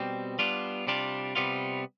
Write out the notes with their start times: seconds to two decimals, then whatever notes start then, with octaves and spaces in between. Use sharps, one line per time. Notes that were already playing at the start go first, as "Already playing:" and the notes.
Already playing: B2 G3 C4
0.39 G3 B3 D4 F4
0.87 C3 G3 D4 F4
1.35 C3 G3 B3 F4